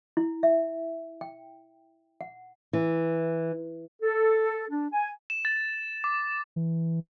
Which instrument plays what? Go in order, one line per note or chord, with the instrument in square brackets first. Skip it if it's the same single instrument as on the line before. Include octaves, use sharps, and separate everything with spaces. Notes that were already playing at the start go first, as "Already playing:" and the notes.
[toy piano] E4
E5
G5
F#5
[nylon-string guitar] E3
[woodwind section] A4
D4
G#5
[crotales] E7
A6
D6
[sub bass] E3